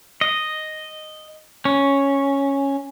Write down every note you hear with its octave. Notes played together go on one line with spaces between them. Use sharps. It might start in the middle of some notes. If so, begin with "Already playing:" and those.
D#5
C#4